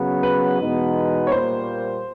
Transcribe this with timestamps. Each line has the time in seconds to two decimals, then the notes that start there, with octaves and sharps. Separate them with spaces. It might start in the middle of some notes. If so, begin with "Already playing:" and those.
Already playing: C#3 F#3 B3
0.23 B4
0.59 E2 B2 G#3 B3 D#4
1.27 C#5
1.32 A#2 G3 A#3 C5